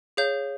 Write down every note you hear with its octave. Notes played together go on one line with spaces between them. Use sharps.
G#4 C#5 F5 G6